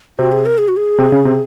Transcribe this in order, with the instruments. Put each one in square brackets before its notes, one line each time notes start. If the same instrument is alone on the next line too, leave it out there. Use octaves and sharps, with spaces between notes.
[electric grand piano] C3 C4 [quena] F#4
[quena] G#4
A#4
G#4
F#4
G#4
[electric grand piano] C3 C4
C#3 C#4
C3 C4